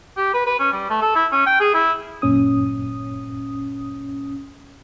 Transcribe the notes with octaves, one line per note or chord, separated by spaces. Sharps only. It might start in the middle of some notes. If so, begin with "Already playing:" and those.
G4
B4
B4
C#4
G3
A3
A4
E4
C#4
G5
G#4
E4
G1 F#2 A#2 C#4 D#6